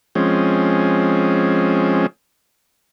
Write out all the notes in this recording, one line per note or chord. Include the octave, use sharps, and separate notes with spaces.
F3 G#3 C4 C#4